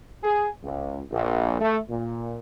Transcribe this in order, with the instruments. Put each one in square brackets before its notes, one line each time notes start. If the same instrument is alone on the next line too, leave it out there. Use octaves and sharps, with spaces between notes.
[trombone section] G#4
C#2
A#1
A3
A#2